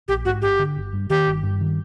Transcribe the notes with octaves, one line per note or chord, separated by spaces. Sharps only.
A#1 G4
G#2 F#4
G1 G4
D3
G1
G2
D#3 G4
G1
G2
D#3